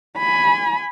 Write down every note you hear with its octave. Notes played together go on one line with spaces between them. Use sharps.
G#5 B5